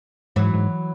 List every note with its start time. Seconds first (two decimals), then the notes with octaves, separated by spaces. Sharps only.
0.36 G#2 E3 F#3
0.54 G#2